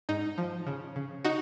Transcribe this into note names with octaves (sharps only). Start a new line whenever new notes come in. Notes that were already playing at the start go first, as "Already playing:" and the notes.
G#2 D#4
F3
C#3
C#3
D#4 F#4